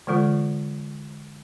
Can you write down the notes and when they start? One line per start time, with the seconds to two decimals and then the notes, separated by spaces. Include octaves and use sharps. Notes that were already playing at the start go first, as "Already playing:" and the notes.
0.07 D3 E3 G#3 F4 A4